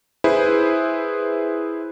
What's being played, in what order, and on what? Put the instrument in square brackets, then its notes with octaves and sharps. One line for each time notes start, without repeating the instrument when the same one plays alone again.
[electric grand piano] E4 G#4 B4 C5